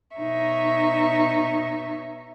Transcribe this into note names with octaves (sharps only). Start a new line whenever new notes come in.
B2 D#4 C#5 E5 C#6